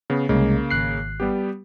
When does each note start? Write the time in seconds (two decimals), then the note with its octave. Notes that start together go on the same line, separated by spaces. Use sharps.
0.10 C#3 B3
0.29 C2 C#3 G#3 A#3
0.70 G#1 F#6 C7
1.20 G3 B3 G4